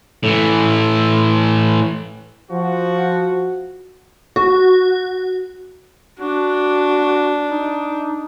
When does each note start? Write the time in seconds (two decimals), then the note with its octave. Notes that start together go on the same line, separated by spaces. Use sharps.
0.23 A2 E3
2.51 F3 F#4
4.36 F#4
6.20 D4 F#4
7.51 D#4